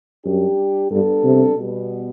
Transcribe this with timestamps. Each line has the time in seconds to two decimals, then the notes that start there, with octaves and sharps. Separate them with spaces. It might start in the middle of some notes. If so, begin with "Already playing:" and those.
0.25 F#2 G3 D4 G4
0.91 G2 G3 B3 D4 A4
1.24 C3
1.57 B2 G3 B3